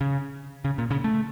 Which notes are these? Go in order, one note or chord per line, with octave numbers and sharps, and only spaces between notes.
C#3
C#3
A#2
C#3
A3